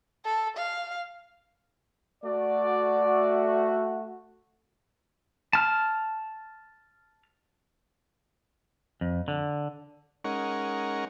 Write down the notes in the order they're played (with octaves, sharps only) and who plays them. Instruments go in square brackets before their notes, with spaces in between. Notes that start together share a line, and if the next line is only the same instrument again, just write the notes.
[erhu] A4
F5
[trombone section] A3 F#4 [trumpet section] D5
[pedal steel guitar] A5 F6
[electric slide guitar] F2
D3
[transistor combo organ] G#3 C#4 D#4 A#4 F#5 C#6